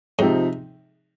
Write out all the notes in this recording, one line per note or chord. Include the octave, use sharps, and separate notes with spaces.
G#2 C3 F3 C4 D#4